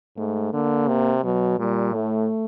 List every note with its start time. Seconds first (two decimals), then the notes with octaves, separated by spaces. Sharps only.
0.17 G#2 A3
0.53 D3 A#3
0.88 C3
1.24 B2 F#3
1.59 A#2 G3
1.95 A2 A3